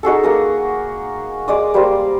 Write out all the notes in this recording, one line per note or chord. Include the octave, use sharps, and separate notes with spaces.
D#4 F#4 G#4 A4
A#3 A#4 D#6
G#3 D5 D#6
G3 A#3 C5